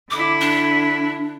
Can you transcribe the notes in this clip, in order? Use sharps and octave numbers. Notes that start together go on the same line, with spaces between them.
D3 E4 D6
D4